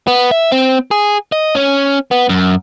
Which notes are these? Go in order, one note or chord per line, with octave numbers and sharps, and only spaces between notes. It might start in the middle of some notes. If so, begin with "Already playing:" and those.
B3
E5
C4
G#4
D#5
C#4
B3
F#2